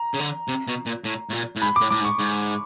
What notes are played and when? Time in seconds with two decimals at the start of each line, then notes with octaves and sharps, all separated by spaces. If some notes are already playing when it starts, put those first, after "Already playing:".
Already playing: A#5
0.14 C#3
0.20 D3
0.48 C3
0.67 B2
0.86 A#2
1.04 A2
1.29 A2
1.33 A#2
1.56 A2
1.62 G#2 B5
1.76 A2 D6
1.90 A2 D6
2.00 G#2
2.05 C#6
2.19 G#2